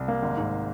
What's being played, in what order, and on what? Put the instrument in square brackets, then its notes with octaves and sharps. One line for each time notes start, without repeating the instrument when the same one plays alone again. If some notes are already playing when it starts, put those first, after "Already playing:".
Already playing: [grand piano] C2
A#3
G#1
G#2